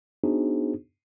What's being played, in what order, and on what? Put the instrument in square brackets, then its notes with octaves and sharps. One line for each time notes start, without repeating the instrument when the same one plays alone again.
[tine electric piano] B3 D4 D#4 F#4 G#4 C5